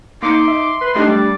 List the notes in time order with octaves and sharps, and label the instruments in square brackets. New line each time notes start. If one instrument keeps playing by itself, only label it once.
[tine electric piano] A#3 C#7 [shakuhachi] D#4 [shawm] C6 [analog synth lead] D6
[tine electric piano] E5
[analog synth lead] B4
[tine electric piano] A3 G4 F#6 [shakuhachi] D4 [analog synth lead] D#4
[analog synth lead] G3 [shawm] D5